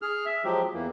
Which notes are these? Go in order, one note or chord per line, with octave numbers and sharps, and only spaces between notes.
G#4 F6
E5
F3 F#3 G#3 G4
E2 E3 A#3